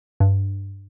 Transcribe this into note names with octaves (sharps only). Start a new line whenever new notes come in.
G2